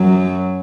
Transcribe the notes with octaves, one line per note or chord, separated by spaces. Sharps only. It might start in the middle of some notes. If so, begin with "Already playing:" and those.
Already playing: F#2 F#3